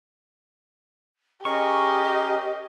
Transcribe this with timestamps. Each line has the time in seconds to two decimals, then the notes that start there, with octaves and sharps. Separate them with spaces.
1.45 C#4 G4 G#4 A#4 D#5 C#6